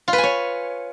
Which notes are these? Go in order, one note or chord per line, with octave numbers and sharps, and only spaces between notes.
F4
B4
G#5
C#5